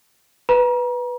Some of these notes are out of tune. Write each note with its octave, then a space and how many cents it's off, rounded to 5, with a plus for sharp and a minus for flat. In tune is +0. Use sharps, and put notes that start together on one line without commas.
B4 +0 A#5 +35